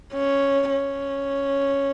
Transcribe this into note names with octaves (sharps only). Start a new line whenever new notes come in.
C#4
C#4